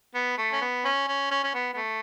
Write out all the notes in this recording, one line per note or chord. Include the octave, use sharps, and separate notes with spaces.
B3
A3
C#4
B3
C#4
C#4
C#4
C#4
B3
B3
A3